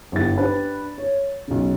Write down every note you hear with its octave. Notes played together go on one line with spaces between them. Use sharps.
G1 D4 E4 G4 A6
D4 G4 B4
C#5
B1 C#3